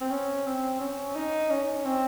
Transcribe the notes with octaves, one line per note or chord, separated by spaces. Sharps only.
C4
C#4
C4
C#4
D#4
C#4
C4